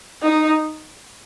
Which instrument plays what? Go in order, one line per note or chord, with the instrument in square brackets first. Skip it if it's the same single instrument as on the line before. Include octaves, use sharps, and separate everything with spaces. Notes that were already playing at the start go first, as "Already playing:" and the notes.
[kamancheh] D#4